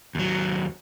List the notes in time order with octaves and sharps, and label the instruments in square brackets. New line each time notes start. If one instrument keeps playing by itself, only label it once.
[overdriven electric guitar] D#2 F#3